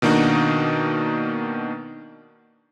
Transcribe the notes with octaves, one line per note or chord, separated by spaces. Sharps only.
B2 D#3 A#3 D4 D#4 F#4